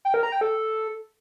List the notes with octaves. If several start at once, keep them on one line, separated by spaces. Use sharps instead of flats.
G5
A#4
A#5
G5
A4